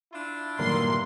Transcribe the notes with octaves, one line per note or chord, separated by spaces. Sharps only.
D4 E4 F4
G2 A#2 D3 D#3 F#3 A#3 C6